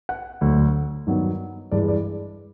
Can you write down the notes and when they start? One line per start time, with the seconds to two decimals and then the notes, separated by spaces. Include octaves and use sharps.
0.09 F#5
0.41 D2 D3 F#3
1.07 G2 D#3 F#3 B3
1.72 G2 E3 G#3 D5
1.88 D5